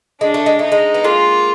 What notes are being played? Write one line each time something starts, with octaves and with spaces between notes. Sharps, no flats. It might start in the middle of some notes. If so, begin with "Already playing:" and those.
G#3 D4
A3
G#3
A3 D#4
G#3
B3
G#3 A#3 F4